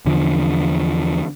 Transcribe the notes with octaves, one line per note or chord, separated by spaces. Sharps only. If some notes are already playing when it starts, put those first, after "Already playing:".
E2 D3 F3